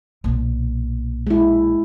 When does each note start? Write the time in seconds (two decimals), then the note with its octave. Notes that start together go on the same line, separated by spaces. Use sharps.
0.24 B1 A#2
1.27 G#3 E4